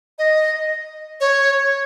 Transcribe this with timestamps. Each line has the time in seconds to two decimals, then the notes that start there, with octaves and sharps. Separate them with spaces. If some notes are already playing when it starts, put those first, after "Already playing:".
0.18 D#5
1.20 C#5